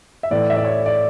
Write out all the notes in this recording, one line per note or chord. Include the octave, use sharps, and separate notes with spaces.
E5
A2 E3 A3 D5
E5
D5
C#5
D5